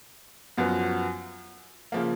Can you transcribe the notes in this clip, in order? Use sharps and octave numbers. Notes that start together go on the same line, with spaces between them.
F#2 F3 B3 F#4
C#3 F3 A#3